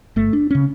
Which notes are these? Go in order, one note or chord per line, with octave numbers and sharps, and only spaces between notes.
G1 A3
D4
C#3 C#4